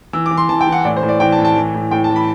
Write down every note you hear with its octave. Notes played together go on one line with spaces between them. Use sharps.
E3 E6
D6
E3
C6
E3 A5
G5
E3
F#5
A2 D5
C5
A2
D5
E3 G5
A5
A2
A5
E3
A2
A2 G5
A5
E3
B5